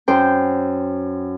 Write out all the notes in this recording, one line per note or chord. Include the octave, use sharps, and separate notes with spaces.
F#2 C5 G5